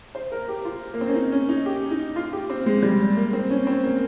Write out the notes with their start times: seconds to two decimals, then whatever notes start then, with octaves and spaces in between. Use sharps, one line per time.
0.15 C5
0.32 A#4
0.48 G4
0.65 F4
0.94 A#3
1.01 C4
1.08 C#4
1.15 D#4
1.32 C#4
1.49 D#4
1.66 G4
1.91 D#4
2.16 F4
2.33 G4
2.50 C4
2.66 G#3
2.83 G3
3.17 A#3
3.33 C4
3.50 C#4
3.67 C4
3.83 A#3